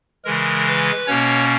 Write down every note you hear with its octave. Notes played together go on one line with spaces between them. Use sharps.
C#3 E3 G#3 A#4
B4
B2 A#3 C#4 C#5